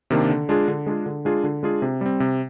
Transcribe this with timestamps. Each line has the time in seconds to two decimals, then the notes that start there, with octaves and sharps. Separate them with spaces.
0.10 C3 D#3 A#3 D4
0.30 D3
0.49 G#3 D4 F4 G#4
0.68 D3
0.86 G#3 D4 F4 G#4
1.06 D3
1.25 G#3 D4 F4 G#4
1.44 D3
1.63 G#3 D4 F4 G#4
1.82 C3
2.01 G3 C4
2.20 C3